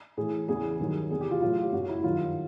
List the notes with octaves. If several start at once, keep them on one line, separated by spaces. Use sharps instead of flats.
A2 E3 G#4
E2 C#3 E3 G#4
G2 D#3 F#3
E2 C3 E3 G#4
G4
F4
A2 F#3 F4
G4
F#2 C#3 F#3 F#4
E4
G2 D#3 F#3 F4